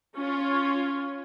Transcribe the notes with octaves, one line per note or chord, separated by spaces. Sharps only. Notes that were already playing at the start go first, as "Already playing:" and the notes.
C#4 F4 C#5